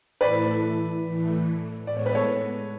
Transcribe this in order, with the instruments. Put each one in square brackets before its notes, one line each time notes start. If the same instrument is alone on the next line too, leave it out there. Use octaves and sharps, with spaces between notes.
[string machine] A2 E3 A3 E4 A4 [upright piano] B4 D5
[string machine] A2 E3 A3
[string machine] A2 G#3 B3 [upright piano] D5
[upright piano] C#5
B4
A4 C#5